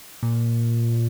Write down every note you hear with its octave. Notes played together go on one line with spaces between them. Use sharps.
A#2